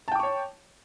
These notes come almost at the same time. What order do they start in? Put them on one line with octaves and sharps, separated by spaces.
A5 G5 D6 C#6 C#5